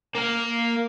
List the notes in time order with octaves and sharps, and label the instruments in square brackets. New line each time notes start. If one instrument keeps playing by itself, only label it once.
[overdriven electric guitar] A#3 F5